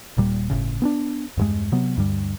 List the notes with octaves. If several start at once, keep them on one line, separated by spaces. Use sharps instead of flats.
D#1 A#2 G3
G1 A2 C#3
B3 C#4 D4
E2 G2 G#3
C3 F#3 B3
D2 G2 G3